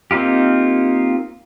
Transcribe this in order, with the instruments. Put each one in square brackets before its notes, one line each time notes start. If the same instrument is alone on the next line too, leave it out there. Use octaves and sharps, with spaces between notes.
[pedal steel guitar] A#3 C4 D#4 F4 G4